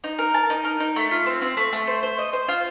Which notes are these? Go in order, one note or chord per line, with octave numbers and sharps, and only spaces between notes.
D#4
A#4
A5
D#4
A#4
D#4
A3
F4
C4
C4
A3
A3
C5
C5
D#5
C5
F4